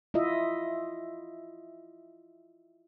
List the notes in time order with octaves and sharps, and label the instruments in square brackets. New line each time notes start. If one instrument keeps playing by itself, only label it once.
[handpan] E4 F4 D#5 E5